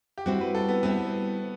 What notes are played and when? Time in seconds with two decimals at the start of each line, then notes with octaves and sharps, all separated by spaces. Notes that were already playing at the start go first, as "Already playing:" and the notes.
0.18 G4
0.26 G3 C4 E4 F#4
0.41 B4
0.55 A4
0.69 B3
0.83 G3 B3 C4 E4